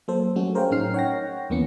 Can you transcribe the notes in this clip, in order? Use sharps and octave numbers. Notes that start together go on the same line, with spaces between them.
F#3 A#3 A4 C5
F#3 G3 A3 C#4 F#4
G#4 A#4 C5 C#5 F5 G5
A2 F#3 C#4 D#4 F6 C7
C#5 F#5 G5 A#6
D#2 E3 A#3 B3 C#4 C#7